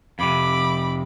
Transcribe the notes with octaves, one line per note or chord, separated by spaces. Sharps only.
F2 C3 B5 D6